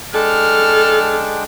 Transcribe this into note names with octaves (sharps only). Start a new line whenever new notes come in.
G#3 D4 A4 G5 F6